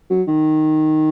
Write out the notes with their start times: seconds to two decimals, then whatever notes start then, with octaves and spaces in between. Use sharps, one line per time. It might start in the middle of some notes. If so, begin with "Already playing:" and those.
0.10 F#3
0.28 D#3